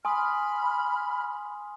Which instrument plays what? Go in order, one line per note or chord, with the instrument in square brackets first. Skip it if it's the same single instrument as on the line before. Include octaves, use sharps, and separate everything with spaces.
[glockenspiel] G#5 C6 D#6 [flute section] B5 F6